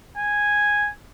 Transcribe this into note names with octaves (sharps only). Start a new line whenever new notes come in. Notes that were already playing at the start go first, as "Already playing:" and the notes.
G#5